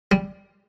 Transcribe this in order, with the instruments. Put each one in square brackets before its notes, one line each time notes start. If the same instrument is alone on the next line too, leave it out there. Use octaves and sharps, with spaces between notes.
[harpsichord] G3